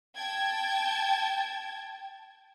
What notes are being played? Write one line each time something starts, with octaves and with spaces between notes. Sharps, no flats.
G5 A5 G#6